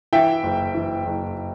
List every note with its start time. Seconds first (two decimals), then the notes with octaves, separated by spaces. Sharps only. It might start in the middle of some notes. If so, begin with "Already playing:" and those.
0.13 E3 E5 G5
0.43 F#1
0.74 E3
1.06 F#1